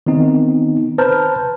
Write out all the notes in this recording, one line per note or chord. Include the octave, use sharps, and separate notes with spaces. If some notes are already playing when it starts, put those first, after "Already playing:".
D#3 B3 C4 D#4
B4 C5 A5 A#5 F6 G6